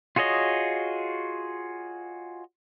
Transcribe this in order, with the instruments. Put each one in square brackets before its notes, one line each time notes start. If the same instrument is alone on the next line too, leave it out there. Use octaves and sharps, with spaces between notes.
[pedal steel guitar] F4 F#4 G#4 C#5 D#5